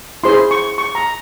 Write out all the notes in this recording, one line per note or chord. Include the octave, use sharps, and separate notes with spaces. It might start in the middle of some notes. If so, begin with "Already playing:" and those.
E4 G#4 C5 C6
C#6
C#6
A#5